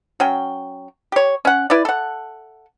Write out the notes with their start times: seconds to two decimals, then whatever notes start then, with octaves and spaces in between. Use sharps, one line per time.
0.20 F#3 C#4 G5
1.12 G4 C#5
1.45 C#4 F#5
1.70 E4 B4 D5
1.85 A4 F#5